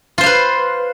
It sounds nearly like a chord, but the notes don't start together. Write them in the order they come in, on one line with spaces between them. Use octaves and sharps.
F4 C5 F5 B4